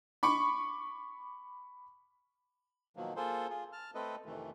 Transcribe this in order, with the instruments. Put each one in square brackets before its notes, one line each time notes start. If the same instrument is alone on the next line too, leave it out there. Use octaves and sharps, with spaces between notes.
[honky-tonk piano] B5 C#6 D6 C#7
[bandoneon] B2 D#3 F3 F#3 A#3
A#3 F4 G#4 A4 C5
F4 G#4
A5 F6
A3 C4 A4 B4 D#5
F2 C3 D#3 E3 A3